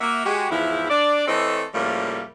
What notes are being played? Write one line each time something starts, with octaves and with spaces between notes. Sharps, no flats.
A#3 F#4 E5
G#3 F#4 G4
E2 G#2 F3 E4
D4 D5
E3 A3 C4 A4 C#5 D#5
A2 C#3 F3 G3 A3 A#3